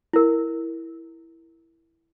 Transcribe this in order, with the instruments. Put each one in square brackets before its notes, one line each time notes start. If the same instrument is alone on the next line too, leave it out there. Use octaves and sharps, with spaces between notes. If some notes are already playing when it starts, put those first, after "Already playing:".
[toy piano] E4 A#4